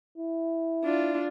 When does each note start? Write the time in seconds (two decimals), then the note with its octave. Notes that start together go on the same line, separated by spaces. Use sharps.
0.18 E4
0.84 D4 F4